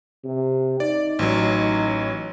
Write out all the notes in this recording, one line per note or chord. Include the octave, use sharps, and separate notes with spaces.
C3
D#4 D5
A1 F#3